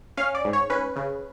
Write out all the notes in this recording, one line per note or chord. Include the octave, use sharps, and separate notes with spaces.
C#4 F5
D5
G#2
C#5
C#4 B4
C#3